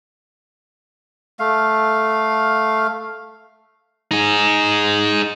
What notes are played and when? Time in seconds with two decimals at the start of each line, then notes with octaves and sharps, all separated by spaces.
1.39 A3 F5
4.11 D#4 G#4